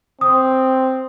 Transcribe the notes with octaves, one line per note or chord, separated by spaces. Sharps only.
C4 D#6